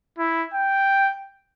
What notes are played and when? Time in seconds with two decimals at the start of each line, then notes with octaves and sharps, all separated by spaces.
0.19 E4
0.54 G5